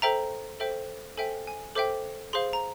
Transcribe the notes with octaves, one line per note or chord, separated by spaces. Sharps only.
A4 C5 E5 G5 A#5
A4 C5 E5 G5
A4 C5 E5 G5 G#5
G#5
A4 C5 E5 G5 D6
G#4 C5 F5 C6
A#5